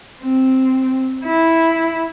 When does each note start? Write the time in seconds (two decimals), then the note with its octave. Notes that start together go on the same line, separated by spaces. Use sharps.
0.22 C4
1.25 E4